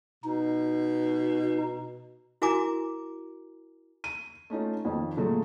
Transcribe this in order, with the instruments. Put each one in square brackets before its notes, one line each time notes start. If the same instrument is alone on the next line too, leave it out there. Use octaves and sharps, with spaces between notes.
[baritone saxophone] B2 [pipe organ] D#4
[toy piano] E4 F#4 A#4 G#5 A#5 D6
[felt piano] D#7
A3 C#4 D#4 F4
F2 D#3 F3
A#2 D3 F3 F#3 G#3 A3